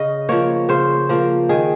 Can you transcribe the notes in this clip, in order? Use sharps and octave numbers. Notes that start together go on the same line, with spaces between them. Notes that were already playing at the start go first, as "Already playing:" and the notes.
Already playing: C#3 D#5
F3 A#3 C#5
C#3 C5
F3 A#3
D#3 G#4